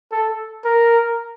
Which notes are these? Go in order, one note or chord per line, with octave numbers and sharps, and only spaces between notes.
A4
A#4